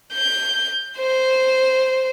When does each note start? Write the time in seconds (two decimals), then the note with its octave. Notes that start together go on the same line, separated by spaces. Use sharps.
0.13 G6
0.99 C5